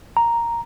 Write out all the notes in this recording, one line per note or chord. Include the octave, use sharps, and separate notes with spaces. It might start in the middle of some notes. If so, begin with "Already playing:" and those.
A#5